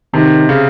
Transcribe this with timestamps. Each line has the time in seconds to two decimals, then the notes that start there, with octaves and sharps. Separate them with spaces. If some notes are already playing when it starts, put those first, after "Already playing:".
0.14 C3 D#3
0.49 C#3